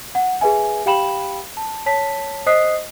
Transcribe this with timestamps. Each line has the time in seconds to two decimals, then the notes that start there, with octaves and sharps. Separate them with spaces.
0.15 F#5
0.41 G#4 B4 E5 G#5
0.86 G4 F5 G5 B5 E7 F#7
1.57 A5
1.86 C#5 A5 B6
2.46 C5 D#5 D#6 F#6 B6 C7